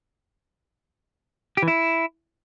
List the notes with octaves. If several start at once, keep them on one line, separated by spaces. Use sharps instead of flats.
G4
E3
E4